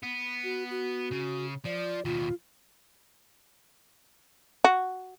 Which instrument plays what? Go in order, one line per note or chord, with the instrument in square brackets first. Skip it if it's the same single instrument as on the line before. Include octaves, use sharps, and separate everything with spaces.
[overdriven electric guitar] B3
[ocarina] F#4
F#4
[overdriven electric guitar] C#3
[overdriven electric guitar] F3 [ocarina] D5
[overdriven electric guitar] D#2 B2 [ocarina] F4
[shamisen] F#4